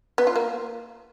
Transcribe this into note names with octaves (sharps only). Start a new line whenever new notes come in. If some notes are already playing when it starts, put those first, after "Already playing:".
B3
F4
A#3